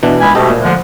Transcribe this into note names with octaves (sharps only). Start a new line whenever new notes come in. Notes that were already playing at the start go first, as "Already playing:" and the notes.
B2 E3 D4
C#2 G#5 B5
D2 B2 G4 A4 D#5
A#2
D3 F3 G#3